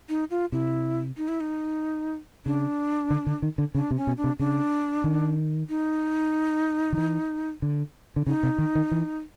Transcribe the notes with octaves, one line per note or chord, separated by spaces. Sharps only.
D#4
F4
C3 E4
D#4
E4
D#4
C#3 D4
D3
D3
D#3
D3
C#3 D4
C3
C#4
B2
D4
C3
C#3 D4
D#3
D#4
D#3
E3
D3
D3
C#3 D#4
C3
D#3
D#3
E3